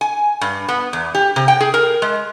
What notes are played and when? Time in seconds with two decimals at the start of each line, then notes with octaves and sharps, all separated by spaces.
0.01 G#5
0.41 G2
0.68 B3
0.93 E2
1.15 G4
1.36 C3
1.48 G5
1.60 G#4
1.74 A#4
2.02 G#3